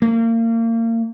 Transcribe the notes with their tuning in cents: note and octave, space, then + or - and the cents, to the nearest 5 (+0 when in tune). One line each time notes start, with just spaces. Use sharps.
A#3 -35